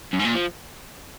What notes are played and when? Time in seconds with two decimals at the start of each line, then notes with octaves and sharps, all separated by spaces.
0.13 F#2
0.19 G#2
0.25 A#2
0.35 F3